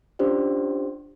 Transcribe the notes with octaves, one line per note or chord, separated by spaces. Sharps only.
C#4 D4 F4 G4 C5 D5